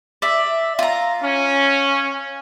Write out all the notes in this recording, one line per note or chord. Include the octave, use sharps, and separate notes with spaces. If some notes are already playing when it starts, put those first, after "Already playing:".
D5 E5
F4 A#5
C#4